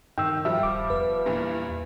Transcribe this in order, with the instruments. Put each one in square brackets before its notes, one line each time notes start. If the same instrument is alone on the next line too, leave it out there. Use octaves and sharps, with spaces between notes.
[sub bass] G2 [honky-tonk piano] D#3 [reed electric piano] G5 E6
[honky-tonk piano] F3 G3 [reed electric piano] E5
[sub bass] D#1 [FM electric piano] D6
[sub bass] E2 [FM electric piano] B4
[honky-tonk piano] G2 A#2 E3